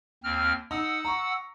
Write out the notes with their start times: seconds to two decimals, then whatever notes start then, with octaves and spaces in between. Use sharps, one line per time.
0.24 D#2 C4 F6
0.71 D#4 F#5 E6
1.05 A#5 C#6